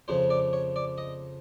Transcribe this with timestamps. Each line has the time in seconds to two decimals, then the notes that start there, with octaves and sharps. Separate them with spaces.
0.08 F2 C#3 F3 C5
0.30 D5
0.53 C#5
0.76 D5
0.98 D#5